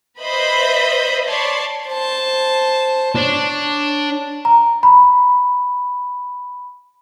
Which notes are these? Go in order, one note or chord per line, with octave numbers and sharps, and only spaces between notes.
B4 C5 D#5 E5 B5 G6
C#5 D5 A5 B5 C6
C5 A5
D4 C#5
A#5
B5